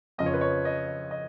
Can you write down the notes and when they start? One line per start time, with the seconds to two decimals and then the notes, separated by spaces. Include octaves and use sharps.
0.18 F2 C#3 F3 D#5
0.26 C#5
0.34 B4
0.41 C#5
0.65 D#5
1.11 D#5